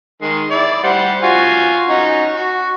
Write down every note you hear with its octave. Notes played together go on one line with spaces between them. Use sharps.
D#3 G#3
E4 D5
G3 C5 F#5
F4 F#4 G#5
C#4 D#4 F#4
F#4